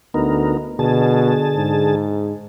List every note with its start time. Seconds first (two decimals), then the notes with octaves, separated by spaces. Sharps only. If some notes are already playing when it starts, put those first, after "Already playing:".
0.14 D2 B3 D#4 A#4
0.79 B2 D3 G#4 A5
1.57 G#2